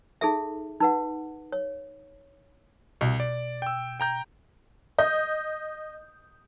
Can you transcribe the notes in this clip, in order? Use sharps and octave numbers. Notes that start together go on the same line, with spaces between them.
D#4 G#4 A4 E5
D#4 B4 F#5
C#5
C2 B2
D5
G5 E6
G5 A#5 G6
D#5 G6